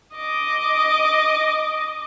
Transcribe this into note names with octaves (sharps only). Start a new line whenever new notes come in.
D#5 D6